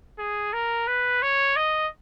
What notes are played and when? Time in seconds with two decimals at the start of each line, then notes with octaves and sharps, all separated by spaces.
0.19 G#4
0.53 A#4
0.87 B4
1.22 C#5
1.56 D#5